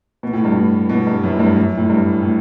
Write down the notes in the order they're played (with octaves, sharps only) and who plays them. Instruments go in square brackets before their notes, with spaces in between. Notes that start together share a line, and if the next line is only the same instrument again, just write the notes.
[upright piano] B2
A2
G2
A2
B2
G2
F#2
A2
G2
F#2
A2
G2
A2